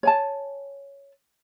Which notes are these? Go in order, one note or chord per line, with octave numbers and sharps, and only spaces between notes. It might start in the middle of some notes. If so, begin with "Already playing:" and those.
C#5 G#5 A5